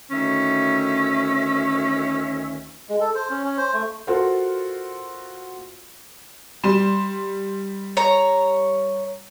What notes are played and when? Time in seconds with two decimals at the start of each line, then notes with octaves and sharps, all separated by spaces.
0.11 D2 D#3 C#4 E5
2.89 G#3
3.01 A4
3.15 C5
3.30 C#4
3.44 C#4
3.57 C5
3.73 A3
4.07 F4 F#4 A4 A#4 C5
6.64 G3 C6 E7
7.97 C#5 A#5